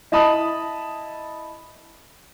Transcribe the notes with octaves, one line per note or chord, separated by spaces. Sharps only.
E4 D#5 A5 B5 D#6 F#7